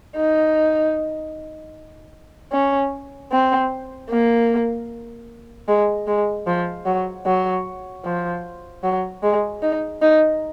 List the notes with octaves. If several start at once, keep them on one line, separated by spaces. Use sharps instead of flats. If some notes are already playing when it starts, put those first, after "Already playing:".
D#4
C#4
C4
A#3
G#3
G#3
F3
F#3
F#3
F3
F#3
G#3
D#4
D#4